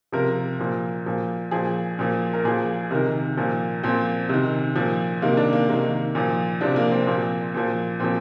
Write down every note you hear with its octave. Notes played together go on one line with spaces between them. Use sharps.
C3 F3 A#4
A#2 F3
A#2 F3
A#2 F3 G#4
A#2 F3
A#4
A#2 F3 G#4
C3 D#3 A#4
A#2 F3
A#2 F3 C4
C3 D#3
A#2 F3
C3 D#3 A#3
D4
A#3
C3 D#3 A#3
A#2 F3
C3 F3 D4
A#3
C4
A#2 F3
A#2 F3
A#2 F3 C4